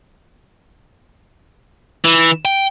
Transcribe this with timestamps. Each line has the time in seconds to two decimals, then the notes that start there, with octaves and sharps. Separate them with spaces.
2.04 E3
2.45 G5